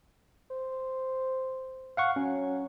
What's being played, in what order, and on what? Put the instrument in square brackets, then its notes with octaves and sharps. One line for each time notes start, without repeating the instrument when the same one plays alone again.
[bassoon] C5
[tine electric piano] F5 F#5 C#6
[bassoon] F#3 [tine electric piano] C#4